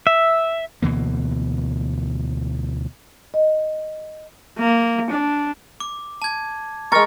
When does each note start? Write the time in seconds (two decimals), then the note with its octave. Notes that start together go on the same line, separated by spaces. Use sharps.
0.07 E5
0.82 D2 B2 E3 A#3
3.34 D#5
4.58 A#3
5.10 D4
5.80 D6
6.22 A5 G#6
6.92 G#3 A#4 C#6 F6 A6